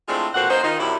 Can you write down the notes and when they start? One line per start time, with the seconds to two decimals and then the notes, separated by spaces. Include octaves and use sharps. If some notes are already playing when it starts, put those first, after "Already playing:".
0.09 G#3 A3 C4 D4 E4 F4
0.35 F2 B2 A#3 F#4 C5 F#5
0.50 A#3 C#4 D#4 C5
0.64 D#3 D#4 F4
0.79 F#2 C3 G3 E4